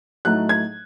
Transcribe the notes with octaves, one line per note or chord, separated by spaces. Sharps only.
A2 F#3 A3 D#4 F#6
G#6